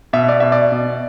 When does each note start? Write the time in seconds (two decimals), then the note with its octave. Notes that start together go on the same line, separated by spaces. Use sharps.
0.13 B2 E5
0.28 D5
0.40 B2 E5
0.52 D5
0.72 B2